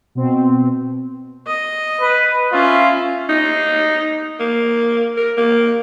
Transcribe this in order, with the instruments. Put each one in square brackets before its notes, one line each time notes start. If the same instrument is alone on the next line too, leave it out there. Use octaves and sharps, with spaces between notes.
[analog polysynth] B2 C4
[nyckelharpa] D#5
[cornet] B4
[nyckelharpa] C#4 E5 [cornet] F4
[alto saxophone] D#4
A#3
A#4
A#3